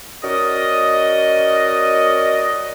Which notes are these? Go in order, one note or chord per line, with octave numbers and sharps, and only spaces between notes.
C#4 F#4 A#4 D5 D#5